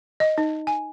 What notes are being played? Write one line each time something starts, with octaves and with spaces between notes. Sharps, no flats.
D#5
D#4
G#5